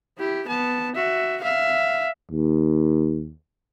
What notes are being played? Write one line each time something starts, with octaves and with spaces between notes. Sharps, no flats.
E4 G4
B3 A5
F#4 E5
E5 F5
D#2